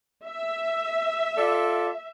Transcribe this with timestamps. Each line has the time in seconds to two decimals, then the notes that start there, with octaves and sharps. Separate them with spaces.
0.25 E5
1.37 F4 A4 D5